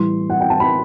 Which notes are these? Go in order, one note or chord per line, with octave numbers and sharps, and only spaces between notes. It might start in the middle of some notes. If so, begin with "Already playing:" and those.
Already playing: A2 E3 G3 C6
F#5
G5
A5
B5